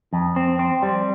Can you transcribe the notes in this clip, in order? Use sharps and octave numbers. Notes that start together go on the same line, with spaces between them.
F2
C4
C4
G3